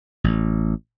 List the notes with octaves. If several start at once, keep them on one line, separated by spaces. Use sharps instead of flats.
A1